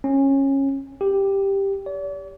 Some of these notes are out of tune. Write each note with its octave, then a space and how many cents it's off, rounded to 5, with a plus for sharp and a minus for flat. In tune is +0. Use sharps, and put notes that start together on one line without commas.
C#4 -20
G4 +5
D5 -45